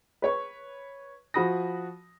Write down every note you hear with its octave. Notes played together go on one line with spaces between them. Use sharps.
B4 C#5 C#6
F3 F#4 B5 D#6 A#6